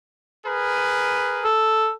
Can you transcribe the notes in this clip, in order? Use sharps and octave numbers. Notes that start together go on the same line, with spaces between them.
G#4 A#4 B4
A4